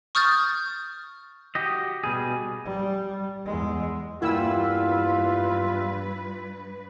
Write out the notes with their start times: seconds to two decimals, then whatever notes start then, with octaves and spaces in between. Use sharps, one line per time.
0.15 C#6 D#6 F6 G6 A6
1.55 F#4 G4 D#5
2.04 B2 G3 G#4
2.65 G3
3.45 E2 G#3
4.22 E2 G2 G3 A#3 E4 F4 B4 E6